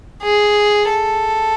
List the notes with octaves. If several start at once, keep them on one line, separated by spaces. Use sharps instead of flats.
G#4
A4